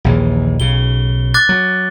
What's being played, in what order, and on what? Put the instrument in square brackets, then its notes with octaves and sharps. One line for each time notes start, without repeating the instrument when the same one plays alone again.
[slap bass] A#1 D#2 E3
[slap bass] B1 C#3 [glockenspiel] G7
[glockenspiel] D6 F#6 A6
[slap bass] F#3